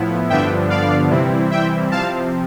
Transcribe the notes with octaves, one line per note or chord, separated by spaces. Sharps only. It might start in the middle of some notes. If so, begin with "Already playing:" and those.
Already playing: A2 F3 B3 E4
G2 D3 F3 B3 D4 E5 G5
D5 F5
C3 E3 G3 C4 E4
E5 G5
C3 F3 C4 F5 A5